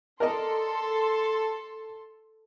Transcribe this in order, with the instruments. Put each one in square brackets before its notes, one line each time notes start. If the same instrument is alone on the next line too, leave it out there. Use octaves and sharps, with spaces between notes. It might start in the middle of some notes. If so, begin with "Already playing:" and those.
[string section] A4 C6 [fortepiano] A#4 D5 D#5